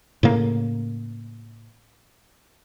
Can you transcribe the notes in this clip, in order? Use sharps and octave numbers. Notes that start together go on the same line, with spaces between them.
A2 C#3 A#3